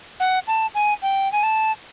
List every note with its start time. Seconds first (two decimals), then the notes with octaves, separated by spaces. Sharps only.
0.20 F#5
0.47 A5
0.75 G#5
1.02 G5
1.32 G#5
1.43 A5